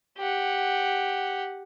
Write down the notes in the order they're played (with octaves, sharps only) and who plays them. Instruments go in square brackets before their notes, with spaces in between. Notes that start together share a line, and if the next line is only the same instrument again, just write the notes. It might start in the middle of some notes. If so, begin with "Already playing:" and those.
[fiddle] G4 F#5